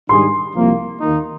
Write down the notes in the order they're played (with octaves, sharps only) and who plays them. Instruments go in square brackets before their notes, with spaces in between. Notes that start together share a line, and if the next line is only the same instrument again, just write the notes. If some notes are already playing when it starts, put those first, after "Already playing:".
[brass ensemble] G#2 D#3 G3 D4 G#4 [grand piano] C6
[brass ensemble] C2 C3 F3 A#3
D#2 D#3 A#3 D#4